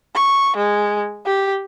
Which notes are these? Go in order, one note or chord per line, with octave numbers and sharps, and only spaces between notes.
C#6
G#3
G4